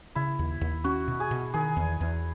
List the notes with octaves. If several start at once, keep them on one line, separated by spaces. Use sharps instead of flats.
C#3 E4
D#2
D#2
C#4 F#4
B2
G#4
B2
D#3 G#4
E2
E2